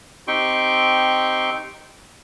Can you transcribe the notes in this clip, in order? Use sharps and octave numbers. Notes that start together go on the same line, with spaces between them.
C4 D#4 G4 G5 C6 C#6